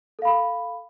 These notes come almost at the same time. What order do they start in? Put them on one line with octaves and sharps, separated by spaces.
A4 F5 B5